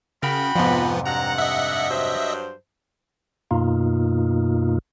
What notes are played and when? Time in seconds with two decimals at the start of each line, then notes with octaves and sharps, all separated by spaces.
0.23 C#3 F#4 A#4 G5 B5
0.55 F2 G#2 C3 F3 B3
1.06 G2 F#5 A#5
1.38 D#5 E5
1.89 G2 F#3 C5
3.51 F#2 B2 A#3 D#4 F4